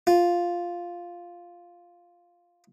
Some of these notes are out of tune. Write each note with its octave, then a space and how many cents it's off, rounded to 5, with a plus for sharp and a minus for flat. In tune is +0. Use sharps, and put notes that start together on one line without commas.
F4 +0